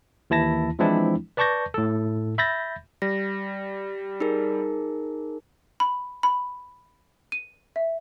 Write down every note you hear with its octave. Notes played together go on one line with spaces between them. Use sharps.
D#2 E3 E4 A5 A#6
E3 F3 G#3 C4 D4 E4
B4 D5 A5 C#6 G6 A#6
A2 A4
E5 B5 G6 A6 A#6
G3 A#6
D#4 G#4 A#4
B5
B5
D#7
E5